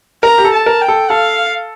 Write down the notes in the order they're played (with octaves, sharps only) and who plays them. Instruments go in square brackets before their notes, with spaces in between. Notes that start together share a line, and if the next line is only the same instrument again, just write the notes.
[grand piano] A#4 [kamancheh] A#5
[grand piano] G4
A4
[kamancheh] A5
[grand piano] A#4
[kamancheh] G5
[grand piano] A4
[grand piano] A4 [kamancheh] F5